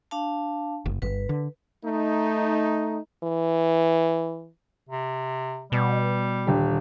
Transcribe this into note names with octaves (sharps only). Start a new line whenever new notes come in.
D4 F5 A5
F#1
G1 B4
D3
A3 D#4
E3
C3
B2 G3
D#1 D3 G4